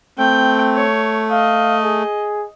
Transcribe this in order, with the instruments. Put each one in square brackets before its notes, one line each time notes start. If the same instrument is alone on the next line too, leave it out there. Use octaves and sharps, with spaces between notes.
[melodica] A3 [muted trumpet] C4 [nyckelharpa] G5
[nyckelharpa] C#5
[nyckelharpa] D#5 [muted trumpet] F5
[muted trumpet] G#4